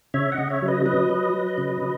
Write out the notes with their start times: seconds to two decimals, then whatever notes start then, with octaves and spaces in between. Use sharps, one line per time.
0.14 C#3 C#5 E5
0.32 D#5 F#5
0.38 C#3
0.50 C#5 E5
0.62 F#3
0.68 B4 D#5
0.85 F#3 B4 D#5
1.10 F#3
1.34 F#3
1.58 C#3
1.82 C#3